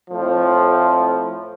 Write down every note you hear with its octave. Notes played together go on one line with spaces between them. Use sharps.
F2 A2 F3